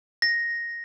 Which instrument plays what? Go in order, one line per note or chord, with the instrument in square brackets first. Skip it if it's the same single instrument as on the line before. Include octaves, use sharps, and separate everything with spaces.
[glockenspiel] A#6